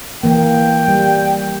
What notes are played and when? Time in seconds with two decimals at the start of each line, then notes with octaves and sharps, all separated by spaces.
0.23 E3 A#3 G5
0.88 G3